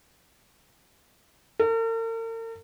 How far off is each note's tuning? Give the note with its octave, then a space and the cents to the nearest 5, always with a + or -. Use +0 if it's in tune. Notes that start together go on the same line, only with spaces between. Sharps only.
A#4 -45